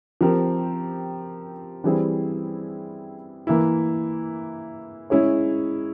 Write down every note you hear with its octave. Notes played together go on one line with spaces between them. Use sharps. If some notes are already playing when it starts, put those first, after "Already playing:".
F3 C4 G4 A#4
E3 G3 C4 E4 G#4
E3 A#3 E4
G#3 C#4 E4 G#4 C#5